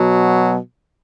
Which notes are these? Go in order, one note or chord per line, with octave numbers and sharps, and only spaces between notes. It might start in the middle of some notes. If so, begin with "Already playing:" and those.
Already playing: B2 F#3